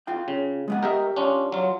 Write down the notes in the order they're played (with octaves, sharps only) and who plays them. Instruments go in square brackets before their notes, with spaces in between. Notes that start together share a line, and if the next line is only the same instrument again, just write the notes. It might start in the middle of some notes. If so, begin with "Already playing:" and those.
[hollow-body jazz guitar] F4 F5 G5
[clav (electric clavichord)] C#3
[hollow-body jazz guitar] G#3 B3 F#5
[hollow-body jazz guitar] G4 [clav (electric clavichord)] A#4 D#5 E5
[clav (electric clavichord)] C#4 D4 F4
F#3 F4